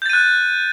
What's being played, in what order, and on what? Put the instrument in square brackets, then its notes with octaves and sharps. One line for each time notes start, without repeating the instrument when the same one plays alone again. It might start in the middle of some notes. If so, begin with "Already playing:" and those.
[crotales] G6
A6
D#7
F#6